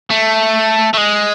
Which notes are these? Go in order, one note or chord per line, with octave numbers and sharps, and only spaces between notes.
A3
A3
G#3